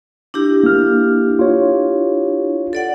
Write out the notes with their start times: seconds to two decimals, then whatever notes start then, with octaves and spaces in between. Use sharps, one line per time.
0.34 D4 E4 G4
0.64 A#3 F6
1.39 F4 C#5
2.73 A4 D5 F#5